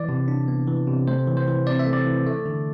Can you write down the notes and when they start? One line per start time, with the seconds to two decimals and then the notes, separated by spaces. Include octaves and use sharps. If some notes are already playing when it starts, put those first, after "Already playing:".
Already playing: E3 D5
0.09 C3
0.28 D4
0.48 B3
0.68 E3
0.87 C3
1.07 A3 C5
1.27 E3
1.37 C5
1.47 E3
1.66 C4 D5
1.80 E5
1.87 A3
1.93 D5
2.06 E3
2.26 A3
2.46 D3